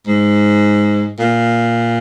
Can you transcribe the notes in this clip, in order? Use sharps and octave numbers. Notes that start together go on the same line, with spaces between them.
G#2
A#2